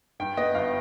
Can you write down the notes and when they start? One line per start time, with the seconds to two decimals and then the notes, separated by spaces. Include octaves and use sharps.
0.20 G2 G5
0.37 B3 D#5
0.54 G1 F5